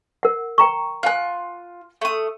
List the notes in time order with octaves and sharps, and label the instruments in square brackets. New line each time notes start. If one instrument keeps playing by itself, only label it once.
[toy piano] A#4 F#5
G5 A#5 C#6
[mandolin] F4 F#6 [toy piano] F#5 G#5
[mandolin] A3 D#6